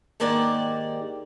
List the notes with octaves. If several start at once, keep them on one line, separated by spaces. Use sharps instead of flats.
G#2 D#3 A#3 G4 D5 F#5